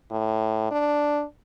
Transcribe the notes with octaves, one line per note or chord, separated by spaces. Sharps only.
A2
D4